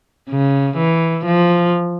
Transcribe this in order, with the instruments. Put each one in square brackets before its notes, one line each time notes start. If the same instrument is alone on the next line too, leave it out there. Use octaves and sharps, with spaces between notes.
[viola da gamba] C#3
E3
F3